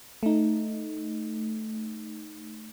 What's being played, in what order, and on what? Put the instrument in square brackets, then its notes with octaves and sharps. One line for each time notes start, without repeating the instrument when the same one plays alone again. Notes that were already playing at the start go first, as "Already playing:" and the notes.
[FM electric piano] A3 D#4